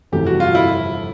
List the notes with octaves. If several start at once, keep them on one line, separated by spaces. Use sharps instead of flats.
G1 F2 C3 E3 A3 G4
F#4
F4
E4